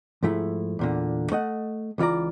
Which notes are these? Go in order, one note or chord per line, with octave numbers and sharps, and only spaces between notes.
G#2 F3 A3 E4
E2 A#2 D3
A3 D#5 F#5
C#2 E3 F4 D5 A#5